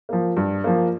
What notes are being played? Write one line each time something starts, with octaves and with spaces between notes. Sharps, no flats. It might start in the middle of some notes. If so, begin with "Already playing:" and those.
F3 A#3
G2
F3 A#3